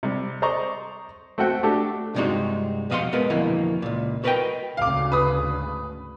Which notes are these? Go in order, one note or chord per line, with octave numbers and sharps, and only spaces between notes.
C3 G3
C5 D5 D#5 A#5 C#6
A3 C4 F#4 E5 F#5 G5
A3 D4 F#4 G4 A4
C2 G2 C3 G#3 D#4 F#4
F2 B2 D#5 F5 F#5 C6
G#3 B3 A#4 B4 D#5
F2 B2 D3 E3 A#3
C#2 A#2
F#4 A#4 B4 D5 D#5 G5
D2 G#2 C#3 F5 D6
B4 D#6